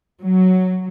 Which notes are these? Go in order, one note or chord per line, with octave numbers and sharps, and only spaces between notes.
F#3